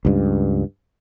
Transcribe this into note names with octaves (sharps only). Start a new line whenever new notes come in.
C#2 G2